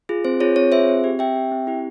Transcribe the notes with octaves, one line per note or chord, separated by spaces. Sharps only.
F4 G#4
C4 C5
F4 G#4 C#5
C4 C#5
F4 G#4 C5 E5
C4
G4
C4 E5 G5
G4
C4
E4 G4